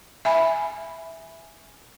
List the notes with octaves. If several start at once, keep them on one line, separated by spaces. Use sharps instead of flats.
E5 G#5 B5